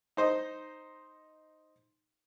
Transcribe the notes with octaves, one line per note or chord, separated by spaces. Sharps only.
D#4 C5 D#5